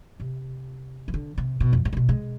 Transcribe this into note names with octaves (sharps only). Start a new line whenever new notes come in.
C3
E3
D3
C3
B2
F2
G#2
A2
B2
G#3